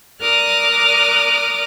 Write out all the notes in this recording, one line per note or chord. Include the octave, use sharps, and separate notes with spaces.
A#4 D5 D6 D#6 F6 F#6